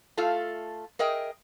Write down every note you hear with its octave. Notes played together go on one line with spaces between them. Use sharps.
A3 F4 A4 F5
G#4 A#4 D#5 E5 G5